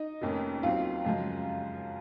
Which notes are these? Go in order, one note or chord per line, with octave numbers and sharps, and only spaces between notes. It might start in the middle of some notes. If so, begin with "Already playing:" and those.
Already playing: D#4 D#5
F1 F2 D#3 A#3 C#4
D#2 D#3 F#3 C4 F4 F5
F#2 C#3 F3 G#3